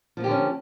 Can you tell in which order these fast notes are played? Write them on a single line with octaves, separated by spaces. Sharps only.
F3 A#3 G4 D3 C#4